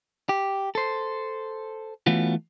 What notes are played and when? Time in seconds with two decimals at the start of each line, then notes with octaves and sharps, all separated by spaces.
0.29 G4
0.75 A4 C5
2.07 E3 A3 B3 C#4 F4 F#4